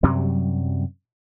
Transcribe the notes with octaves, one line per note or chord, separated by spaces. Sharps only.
F#2 C3 F#3 G3